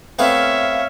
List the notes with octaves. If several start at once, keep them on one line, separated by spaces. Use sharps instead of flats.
A3 B3 C4 C#5 E5 F5